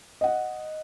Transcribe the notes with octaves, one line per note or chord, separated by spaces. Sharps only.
D#5 F#5